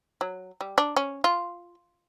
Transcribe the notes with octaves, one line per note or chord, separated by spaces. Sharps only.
F#3
G3
D4
C#4
F4